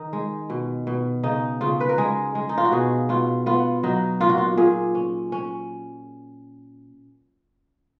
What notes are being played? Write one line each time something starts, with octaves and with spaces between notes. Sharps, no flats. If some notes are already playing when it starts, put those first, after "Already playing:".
Already playing: D#3 D#4
G#3
B2
B2
C#3 D#4
C#3 F4
B4
A#4
G#3 G#4
G#3
D#4
F4
F#4
B2 G#4
B2 F4
B3 F4
F#3 D#4
A#2 F4
F#4
F4
A#2 G#4
C#4
C#4